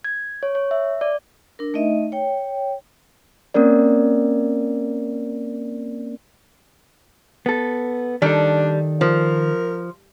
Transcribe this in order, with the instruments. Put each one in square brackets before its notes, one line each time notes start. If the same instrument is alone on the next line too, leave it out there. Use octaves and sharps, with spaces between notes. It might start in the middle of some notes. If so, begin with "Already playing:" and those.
[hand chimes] G#6
C#5
C#5
E5
D5
[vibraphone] D4 A#4
A3 D#4 D#5 E5
C#5 G5
[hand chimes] A#3 C4 C#4 A#4 D5
[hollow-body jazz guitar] B3 A4
[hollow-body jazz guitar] D#3 A4 [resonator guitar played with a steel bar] G3 [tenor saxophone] D4
[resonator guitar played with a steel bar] F3 [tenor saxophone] A#4